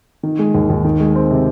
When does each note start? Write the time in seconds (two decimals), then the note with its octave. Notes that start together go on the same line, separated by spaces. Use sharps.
0.23 D#3
0.39 G#3
0.55 D#2
0.70 D#2
0.84 D#3
1.00 G#3
1.15 C4
1.31 C3